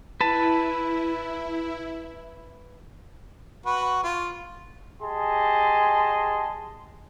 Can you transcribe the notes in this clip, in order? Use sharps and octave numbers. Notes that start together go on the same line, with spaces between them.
E4 B4 A5
F#4 B4
F4
G4 G#4 D#5 G#5 A5 C6